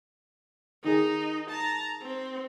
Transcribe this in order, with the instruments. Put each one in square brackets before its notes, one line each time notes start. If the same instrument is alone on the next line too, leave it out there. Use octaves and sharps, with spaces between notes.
[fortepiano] D#3 G#4 [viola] D#4
[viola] A5 A#5
C4